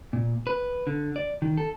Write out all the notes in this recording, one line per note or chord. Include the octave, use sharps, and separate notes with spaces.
A#2
B4
D3
D5
D#3
A4